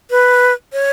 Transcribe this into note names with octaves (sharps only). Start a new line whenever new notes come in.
B4
C#5